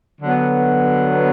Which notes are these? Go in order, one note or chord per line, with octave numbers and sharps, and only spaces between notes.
D3 F#3 B3